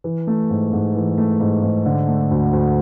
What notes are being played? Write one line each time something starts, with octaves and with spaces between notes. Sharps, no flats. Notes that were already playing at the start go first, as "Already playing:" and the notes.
E3
A3
G#2
G#2
E3
A3
G#2
G#2
D3
A3
D2
D2